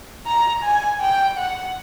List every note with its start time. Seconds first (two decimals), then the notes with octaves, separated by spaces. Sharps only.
0.27 A#5
0.63 G#5
1.00 G5
1.37 F#5